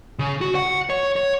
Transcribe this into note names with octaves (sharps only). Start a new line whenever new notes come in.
C#3
F#4
F#5
C#5
C#5